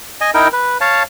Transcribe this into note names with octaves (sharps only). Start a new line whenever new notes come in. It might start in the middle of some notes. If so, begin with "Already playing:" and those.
D#5 G#5
D#4 E4 A#4 G5
B4
C#5 F5 A5